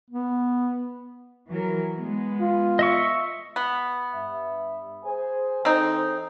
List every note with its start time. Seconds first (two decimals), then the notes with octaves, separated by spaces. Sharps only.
0.10 B3
1.49 E3 F#3 A#4
1.97 G#3 B3
2.40 F4
2.79 D#5 E5 C#6
3.56 B3
4.12 G2 E5
5.04 G#4 C5 G#5
5.65 E3 C4 D#4 A4 C5